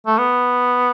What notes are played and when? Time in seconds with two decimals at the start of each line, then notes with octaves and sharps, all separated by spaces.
0.06 A3
0.18 B3